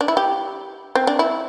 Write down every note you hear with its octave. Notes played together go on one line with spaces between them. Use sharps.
D4
E4
G4
C4
D4
E4